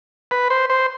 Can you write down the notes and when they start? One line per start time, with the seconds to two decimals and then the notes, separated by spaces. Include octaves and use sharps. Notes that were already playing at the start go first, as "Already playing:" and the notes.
0.31 B4
0.50 C5
0.70 C5